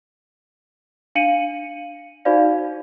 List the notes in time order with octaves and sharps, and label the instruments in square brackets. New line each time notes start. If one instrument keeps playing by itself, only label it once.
[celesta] D4 F5 C#7 D#7 F#7
D#4 F#4 C5 D5 F5